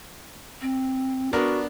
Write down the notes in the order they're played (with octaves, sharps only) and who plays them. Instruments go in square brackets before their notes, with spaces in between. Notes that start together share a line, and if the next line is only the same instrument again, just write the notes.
[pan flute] C4
[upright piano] B3 D4 A#4 [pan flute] F#4